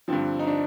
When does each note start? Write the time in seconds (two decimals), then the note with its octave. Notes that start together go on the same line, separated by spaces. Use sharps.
0.08 G2 D3 F3 C4
0.39 D#4
0.47 D4